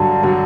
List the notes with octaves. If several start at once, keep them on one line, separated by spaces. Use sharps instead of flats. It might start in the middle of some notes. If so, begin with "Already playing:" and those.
Already playing: G2 D3 F#3
D3 F#3